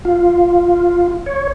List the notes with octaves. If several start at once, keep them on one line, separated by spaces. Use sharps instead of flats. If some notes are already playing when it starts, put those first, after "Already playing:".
F4
C#5